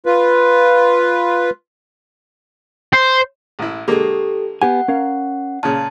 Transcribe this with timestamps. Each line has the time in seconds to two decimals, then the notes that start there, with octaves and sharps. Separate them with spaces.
0.06 F4 B4
2.93 C5
3.59 A1 E4
3.88 D3 G#3 A#3 G4 A4
4.62 B3 G4 F#5 G#5
4.88 C#4 A#4 F5
5.63 A#2 C#3 A5